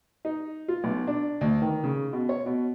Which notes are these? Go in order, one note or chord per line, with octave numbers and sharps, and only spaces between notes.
D#4
F4
B1
D4
D2
D#3
C#3
B2
C#5
B2